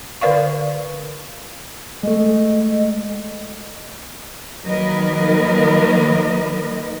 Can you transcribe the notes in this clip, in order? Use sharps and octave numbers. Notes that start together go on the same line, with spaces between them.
D3 A#4 B4 D5 F5 C#6
G#3 A3 D#5
D#3 F#3 A#3 A#4 B4 D#5